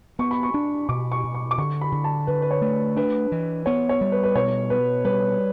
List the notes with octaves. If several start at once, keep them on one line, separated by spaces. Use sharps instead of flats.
B3 C#6
B5
C#6
D4
B2 D6
C#6
B2
C#6
D6
D3 C#6
B5
D3
A5
D3 B4
B4
C#5
A3
D4 B4
E3
B3 C#5
C#5
G3
B4
B4
B2 C#5
B2 B4
G3 B4